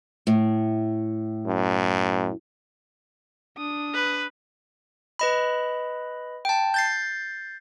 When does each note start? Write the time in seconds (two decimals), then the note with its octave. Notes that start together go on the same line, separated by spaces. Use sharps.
0.27 A2
1.46 F#2
3.57 D4 D#6
3.94 B4
5.19 B4 D#5 B5
6.45 G5 A5
6.74 G6 A6 C7